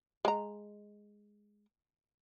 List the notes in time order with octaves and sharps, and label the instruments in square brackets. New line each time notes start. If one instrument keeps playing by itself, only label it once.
[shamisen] G#3 A#5